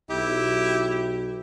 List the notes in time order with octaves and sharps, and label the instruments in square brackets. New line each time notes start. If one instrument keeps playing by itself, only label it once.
[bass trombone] B1 [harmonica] E4 G4